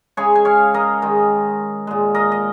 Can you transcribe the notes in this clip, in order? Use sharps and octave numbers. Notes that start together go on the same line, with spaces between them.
C#3 G#3 G#4 C#5
G#5
C#5 F5
A#4 D#5
D#3 G#3
A#2 G#3
A#4 D#5
D#5